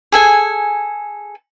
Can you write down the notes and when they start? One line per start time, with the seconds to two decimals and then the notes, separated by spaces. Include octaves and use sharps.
0.12 G#4 A4 G#5